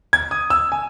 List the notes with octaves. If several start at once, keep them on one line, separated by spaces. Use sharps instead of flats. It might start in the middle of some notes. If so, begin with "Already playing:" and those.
G#6
D#6
E6
G#5